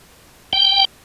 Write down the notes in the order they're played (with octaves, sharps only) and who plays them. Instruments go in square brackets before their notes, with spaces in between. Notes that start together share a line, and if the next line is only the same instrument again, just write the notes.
[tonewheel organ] G5